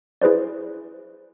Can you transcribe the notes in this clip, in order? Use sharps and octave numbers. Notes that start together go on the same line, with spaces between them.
E4 G#4 B4 C5 D5